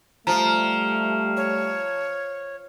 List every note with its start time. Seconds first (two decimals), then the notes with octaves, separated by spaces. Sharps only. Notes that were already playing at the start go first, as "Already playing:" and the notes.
0.27 F3 G3 A3 A#5
1.37 C#5